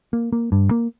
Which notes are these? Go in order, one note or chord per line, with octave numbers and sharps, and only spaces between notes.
A#3
A#3
G2
A#3